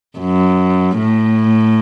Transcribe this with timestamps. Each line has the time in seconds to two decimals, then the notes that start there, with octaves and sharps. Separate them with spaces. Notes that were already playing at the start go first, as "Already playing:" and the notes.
0.18 F#2
0.98 A2